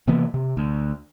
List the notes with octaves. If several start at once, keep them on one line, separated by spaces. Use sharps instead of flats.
C3 E3 A#3 B3
C3
D2